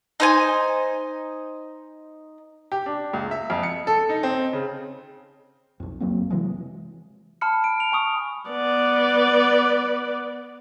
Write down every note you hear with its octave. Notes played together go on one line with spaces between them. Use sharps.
D#4 C5 G#5
G4
D4
C#2
E5
F2
C#7
A4
D#4
C4
C#3
B1 F2
F#1 F#3 A#3 C4
C3 E3 F#3 G#3
A5 B5 F6 C#7
D7
F7
G#5 C#6 D#6
B3 D5